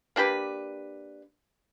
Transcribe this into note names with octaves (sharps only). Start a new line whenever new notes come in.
A#3 D4 G4 B4